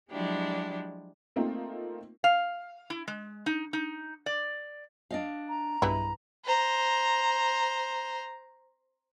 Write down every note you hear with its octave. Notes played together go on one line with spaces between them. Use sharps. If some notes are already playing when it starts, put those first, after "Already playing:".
F3 F#3 G#3 D4 E4 G4
A3 A#3 C4 D#4 F4 A#4
F5
E4
G#3
D#4
D#4
D5
D4 D#5 F5
A#5
B1 G2 E3 G#3 E4 B4
C5 A#5